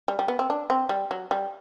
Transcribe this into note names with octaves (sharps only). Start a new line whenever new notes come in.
G3
G3
B3
C4
D4
C4
G3
F#3
G3